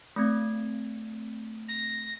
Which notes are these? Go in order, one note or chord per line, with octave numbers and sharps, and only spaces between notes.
A3 C4 G#6
A#6